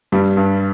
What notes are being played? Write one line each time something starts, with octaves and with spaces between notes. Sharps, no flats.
G2 G3
G2